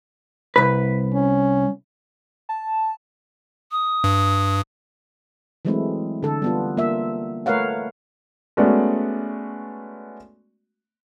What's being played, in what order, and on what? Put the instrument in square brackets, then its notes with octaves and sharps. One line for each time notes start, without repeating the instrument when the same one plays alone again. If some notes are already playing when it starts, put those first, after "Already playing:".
[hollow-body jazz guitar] C2 B4
[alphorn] C#4
[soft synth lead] A5
[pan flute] D#6
[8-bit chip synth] G2
[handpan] E3 F#3 G#3 A3 C4 E4
D3 A4
G3 B3 F4
A#3 F4 E5
A3 A#4 B4 C#5 F5 F#5
[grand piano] G#3 A3 B3 C#4 F#4 D5